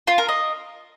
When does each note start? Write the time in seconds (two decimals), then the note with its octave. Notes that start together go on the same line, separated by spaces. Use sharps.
0.07 F4
0.18 A#4
0.28 D#5